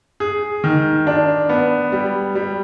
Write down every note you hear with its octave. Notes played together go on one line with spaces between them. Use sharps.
G#4
D#3
D4
B3
G3
G3